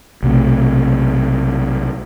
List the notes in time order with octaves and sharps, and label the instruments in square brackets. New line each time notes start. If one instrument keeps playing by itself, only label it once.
[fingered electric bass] B1 C3 A3